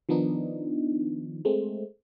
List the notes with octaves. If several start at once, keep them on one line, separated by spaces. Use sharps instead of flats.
D#3 F3 B3 D4 D#4
G#3 A3 C4